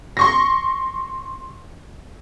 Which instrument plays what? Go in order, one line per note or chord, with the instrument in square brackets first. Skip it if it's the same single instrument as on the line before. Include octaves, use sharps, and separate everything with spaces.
[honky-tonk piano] C6 C#6 A#6